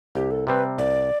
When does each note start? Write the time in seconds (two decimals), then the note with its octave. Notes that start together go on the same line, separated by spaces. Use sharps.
0.15 C2 G4
0.31 A4
0.47 C3 G3 C4 B4
0.78 C2 D5